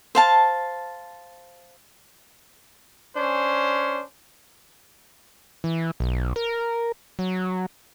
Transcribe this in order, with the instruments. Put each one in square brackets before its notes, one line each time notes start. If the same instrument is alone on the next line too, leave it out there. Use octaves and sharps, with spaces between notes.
[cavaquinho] C5 F5 A5
[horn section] C#4 D4 C5
[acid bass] E3
B1
A#4
F#3